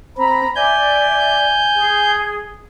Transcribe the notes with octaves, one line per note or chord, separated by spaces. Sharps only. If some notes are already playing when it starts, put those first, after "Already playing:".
C4 A#5 B5
D5 E5 G#5 G6
G#4